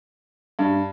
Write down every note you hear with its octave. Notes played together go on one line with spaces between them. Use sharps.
G2